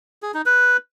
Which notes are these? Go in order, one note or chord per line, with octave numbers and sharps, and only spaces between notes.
G#4
D#4
B4